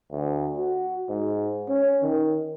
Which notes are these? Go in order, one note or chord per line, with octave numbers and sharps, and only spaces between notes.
D2
F#4
G#2
C#4
D#3